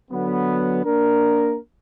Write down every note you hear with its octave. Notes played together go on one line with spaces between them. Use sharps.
D3 F#3 B3
A#3 D4 A#4